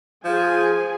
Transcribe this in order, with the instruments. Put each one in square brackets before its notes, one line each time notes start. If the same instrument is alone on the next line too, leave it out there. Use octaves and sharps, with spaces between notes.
[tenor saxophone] F3 [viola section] G#4 G#5